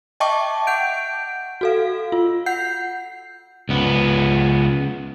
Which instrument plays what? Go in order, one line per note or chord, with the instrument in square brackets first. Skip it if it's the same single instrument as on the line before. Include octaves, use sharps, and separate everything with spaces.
[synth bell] D#5 E5 G5 A5 C#6 D6
F#5 G6 D7
F#4 A4 F5
F4
F#5 G6 C7
[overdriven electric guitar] C#2 B3